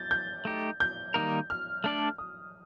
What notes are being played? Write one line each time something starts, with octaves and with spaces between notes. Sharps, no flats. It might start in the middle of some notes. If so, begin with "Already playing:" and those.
Already playing: G6 A6
G6
A3 D#4 G4
G6
D#3 G3 A#3 D#4 A#4
F6
A3 D4 A4 D5
D#6